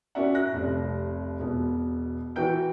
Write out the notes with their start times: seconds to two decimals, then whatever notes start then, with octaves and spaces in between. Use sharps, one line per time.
0.15 C#4 F#4 A#4 D5 E5 F#5
0.35 F#6 A#6
0.53 F1 C2
1.40 E1 B2
2.36 E3 F#4 G5 G6 D7